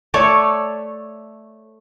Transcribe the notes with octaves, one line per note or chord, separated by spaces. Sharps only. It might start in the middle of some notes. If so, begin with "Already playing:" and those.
A3 A4 C#5 D5